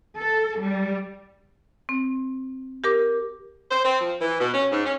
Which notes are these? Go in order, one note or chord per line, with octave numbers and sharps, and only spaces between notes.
A4
G3
C4
G4 A#4 D6
C5
C4
F3
E3
B2
C#4
G#2
C#4